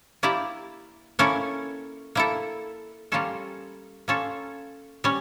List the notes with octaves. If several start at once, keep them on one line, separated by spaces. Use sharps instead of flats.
A#3 E4 G4 D5
A#3 C#4 E4 A4
A#3 E4 A4
G3 A#3 C#4 F4 A4
A#3 C#4 F4 A4
G3 C#4